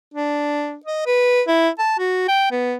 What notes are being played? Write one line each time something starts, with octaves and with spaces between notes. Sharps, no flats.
D4
D#5
B4
E4
A5
F#4
G5
B3